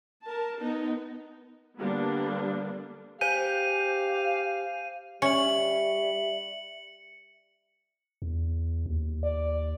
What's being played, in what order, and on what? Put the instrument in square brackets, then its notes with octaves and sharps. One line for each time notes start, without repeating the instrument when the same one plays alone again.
[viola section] A#4 A5
B3 D#4
D3 G3 A#3 B3 D4
[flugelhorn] G4 [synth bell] C5 G#5 G6 [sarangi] F5 [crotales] D#7
[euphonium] G3 [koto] C#4 [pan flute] E5 [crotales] C#7 F#7
[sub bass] E2
D#2
[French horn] D5